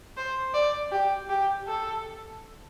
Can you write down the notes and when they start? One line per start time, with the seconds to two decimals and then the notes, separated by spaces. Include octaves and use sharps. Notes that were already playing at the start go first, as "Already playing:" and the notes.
0.17 C5
0.54 D5
0.91 G4
1.30 G4
1.68 A4